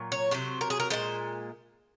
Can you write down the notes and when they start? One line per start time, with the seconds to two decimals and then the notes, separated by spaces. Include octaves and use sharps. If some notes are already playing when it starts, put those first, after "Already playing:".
Already playing: A#2 F#3
0.12 C#5
0.31 C3 F#3 C5
0.61 A#4
0.70 G#4
0.80 A#4
0.90 A#2 F3 G#3 C5